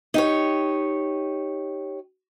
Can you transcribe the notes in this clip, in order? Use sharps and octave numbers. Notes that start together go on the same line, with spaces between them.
D#4 G4 C#5